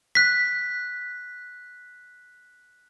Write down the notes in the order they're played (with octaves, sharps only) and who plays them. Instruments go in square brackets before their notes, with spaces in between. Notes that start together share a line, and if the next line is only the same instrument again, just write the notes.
[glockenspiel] F#6 B6